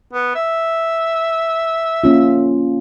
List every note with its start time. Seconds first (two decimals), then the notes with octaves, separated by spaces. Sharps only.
0.13 B3
0.35 E5
2.04 A#3 C#4 F4